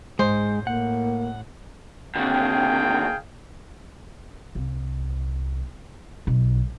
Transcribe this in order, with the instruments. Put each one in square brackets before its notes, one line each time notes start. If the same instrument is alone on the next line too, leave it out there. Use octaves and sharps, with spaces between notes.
[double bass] G#2 [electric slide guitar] G#3 [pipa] C5
[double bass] A2 [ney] A#3 [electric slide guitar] F#5
[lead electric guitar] D#2 D3 [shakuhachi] C4 [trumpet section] G#4 F5 G5
[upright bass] C2
B1